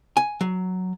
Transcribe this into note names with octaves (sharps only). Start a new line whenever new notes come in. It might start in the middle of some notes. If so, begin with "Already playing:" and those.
G#5
F#3